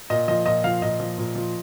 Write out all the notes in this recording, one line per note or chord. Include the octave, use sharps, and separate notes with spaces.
A#2 D#5
F3 D#5
A#2 D#5
F3 F5
A#2 D#5
F3
A#2
F3